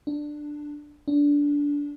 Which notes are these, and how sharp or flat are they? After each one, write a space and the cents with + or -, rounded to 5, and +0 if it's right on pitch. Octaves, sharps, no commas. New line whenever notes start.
D4 +10
D4 -20